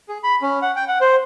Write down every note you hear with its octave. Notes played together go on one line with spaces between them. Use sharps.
G#4
B5
C#4
F#5
G5
F#5
C5